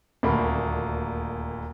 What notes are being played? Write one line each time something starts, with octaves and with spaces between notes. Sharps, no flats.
D#1 D2 A#3 B5